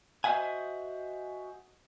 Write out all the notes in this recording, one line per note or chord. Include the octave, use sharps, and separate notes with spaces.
F#4 C5 D#5 E5 F#5 G#5